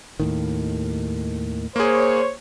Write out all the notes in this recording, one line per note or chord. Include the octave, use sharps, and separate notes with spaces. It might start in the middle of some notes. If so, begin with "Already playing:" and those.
D#2 A2 D#3
A#3 G#4 C5 C#5